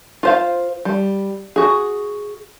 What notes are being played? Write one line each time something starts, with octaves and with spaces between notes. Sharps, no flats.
F4 C5 F5
G3
F#4 G#4